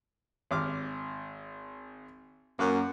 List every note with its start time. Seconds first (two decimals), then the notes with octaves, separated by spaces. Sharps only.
0.51 G#1 D6 F6
2.59 F#2 A#3 F#6